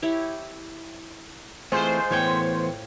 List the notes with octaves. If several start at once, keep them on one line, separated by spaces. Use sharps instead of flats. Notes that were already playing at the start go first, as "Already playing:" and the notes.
E4 G4 C#5
E3 G#3 A3 C4 F4 C5
A2 E3 A3 B3 C#5 G5